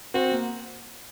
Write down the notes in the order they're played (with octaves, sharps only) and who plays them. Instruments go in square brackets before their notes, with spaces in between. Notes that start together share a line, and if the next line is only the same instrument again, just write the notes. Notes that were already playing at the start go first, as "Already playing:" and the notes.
[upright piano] C4 [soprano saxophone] F#4
[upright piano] A#3